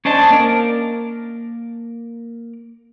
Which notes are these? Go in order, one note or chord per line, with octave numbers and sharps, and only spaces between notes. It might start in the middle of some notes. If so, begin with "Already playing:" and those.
C#4 D4 C5 D#5 A5
A#3 A#4